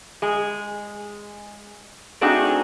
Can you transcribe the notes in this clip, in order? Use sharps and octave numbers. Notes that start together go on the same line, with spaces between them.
G#3 G#4
A3 C4 D4 D#4 F#4 G#4